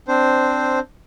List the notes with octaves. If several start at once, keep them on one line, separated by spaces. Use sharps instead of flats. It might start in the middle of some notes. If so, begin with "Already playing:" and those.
C4 D4 C5